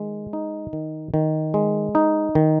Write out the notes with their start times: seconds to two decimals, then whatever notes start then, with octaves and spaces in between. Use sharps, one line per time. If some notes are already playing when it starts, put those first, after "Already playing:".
Already playing: D#3 G#3
0.33 D#4
0.73 D#3
1.14 D#3
1.54 G#3
1.95 D#4
2.35 D#3